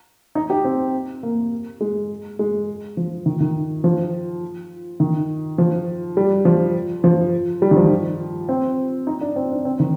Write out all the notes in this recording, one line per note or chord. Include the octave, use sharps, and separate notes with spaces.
D#4
G4
C4
A#3
G#3
G#3
F3
D#3
D#3
F3
D#3
F3
G3
F3
F3
G3
D#3
F3
C4
D#4
D4
C4
D4
C4
D#3